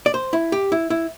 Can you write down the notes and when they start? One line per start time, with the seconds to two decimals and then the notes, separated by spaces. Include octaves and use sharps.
0.06 D5
0.14 C5
0.33 E4
0.52 G4
0.72 E4
0.90 E4